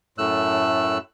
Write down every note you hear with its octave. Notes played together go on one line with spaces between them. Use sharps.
F#2 A2 A3 E6 F#6